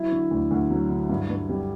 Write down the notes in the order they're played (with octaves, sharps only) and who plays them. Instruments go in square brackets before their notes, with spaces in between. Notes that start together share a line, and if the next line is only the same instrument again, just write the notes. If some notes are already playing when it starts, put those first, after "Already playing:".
Already playing: [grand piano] F#3 E4
D3
D2
D2
F#3
D3
G2
G2
G3